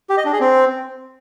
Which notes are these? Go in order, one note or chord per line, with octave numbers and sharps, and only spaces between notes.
G4
D#5
D4
G#4
C4